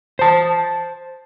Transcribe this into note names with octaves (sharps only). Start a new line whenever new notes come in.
C5 A5